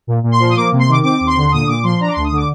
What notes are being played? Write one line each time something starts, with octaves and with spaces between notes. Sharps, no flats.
A#2
A#2
C6
F3
D#6
A#3 D6
C3
C6
D#3 D6
C4 D6
D#2
C6
D3
A#2 D#6
A#2 D6
F3 C6
D4 A#5
D6
D2 C6
D#6
D3 D6